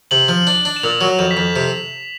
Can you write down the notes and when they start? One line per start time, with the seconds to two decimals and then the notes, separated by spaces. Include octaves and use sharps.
0.11 C3 F#7
0.28 F3
0.47 D4
0.65 D4
0.76 E7
0.83 A#2 F7
1.01 F#3
1.19 F2 E7
1.31 B6
1.37 F2
1.56 C3